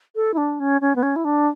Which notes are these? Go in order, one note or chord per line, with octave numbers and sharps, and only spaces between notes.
A4
E4
D4
C#4
C#4
B3
C#4
E4
D4